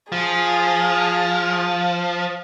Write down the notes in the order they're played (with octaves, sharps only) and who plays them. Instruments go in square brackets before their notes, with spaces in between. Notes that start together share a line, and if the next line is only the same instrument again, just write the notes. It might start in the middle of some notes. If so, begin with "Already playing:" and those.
[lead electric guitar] F3 [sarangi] G#4